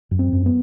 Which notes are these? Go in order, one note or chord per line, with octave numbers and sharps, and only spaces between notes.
F#2
C4
F#2
B3